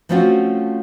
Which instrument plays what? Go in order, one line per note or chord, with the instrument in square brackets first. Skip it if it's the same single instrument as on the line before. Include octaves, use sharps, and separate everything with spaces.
[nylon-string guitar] F3 A3 C4 C#4 F4 F#4